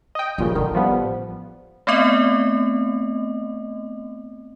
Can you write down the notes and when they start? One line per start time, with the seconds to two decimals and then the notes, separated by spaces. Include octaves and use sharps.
0.15 D#5 G5
0.38 G2 A#2 C#3 F3
0.55 A1 D3 D#3
0.75 F3 G3 B3
1.87 A3 B3 C4 D#5